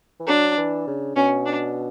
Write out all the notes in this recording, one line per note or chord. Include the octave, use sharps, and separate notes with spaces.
E3
F#3 D4
E3
C#3
B2 C#4
D4